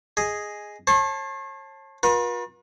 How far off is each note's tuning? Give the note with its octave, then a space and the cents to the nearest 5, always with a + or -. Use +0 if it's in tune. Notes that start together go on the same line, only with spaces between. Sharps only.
G#4 +0 D#5 +0
C#5 -40 A5 +0 C6 +0
F4 +45 B4 -45